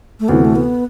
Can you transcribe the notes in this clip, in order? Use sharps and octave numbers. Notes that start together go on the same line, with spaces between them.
A3
D2 C3 E3 B3
A3
B3